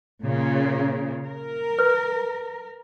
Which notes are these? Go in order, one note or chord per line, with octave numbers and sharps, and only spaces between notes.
A#2 C#3
A#4
B4